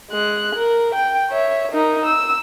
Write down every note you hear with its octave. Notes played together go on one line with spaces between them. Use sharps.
G#3 F#6
A#4
G5
C#5 E5
D#4 A#4
E6